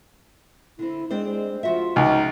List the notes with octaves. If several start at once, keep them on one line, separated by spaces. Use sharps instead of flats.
D3 C4 E4
G#3 C4 D4 C5
F3 F4 F#4 E5
C#2 D#4